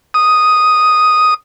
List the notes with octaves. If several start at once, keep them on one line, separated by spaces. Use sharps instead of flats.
D#6